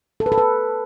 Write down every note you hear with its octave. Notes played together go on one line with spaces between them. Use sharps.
A4
B4
A4
B4